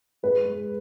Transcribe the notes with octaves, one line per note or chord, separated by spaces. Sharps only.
G#3 B4
G#3